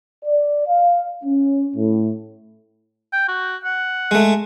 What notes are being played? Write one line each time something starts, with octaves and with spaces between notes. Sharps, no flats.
D5
F5
C#4
A2
G5
F#4
F#5
G#3 A3